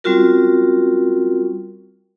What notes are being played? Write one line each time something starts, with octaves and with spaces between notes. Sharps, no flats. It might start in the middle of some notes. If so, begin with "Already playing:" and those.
G3 C4 C#4 F4 F#4 A#4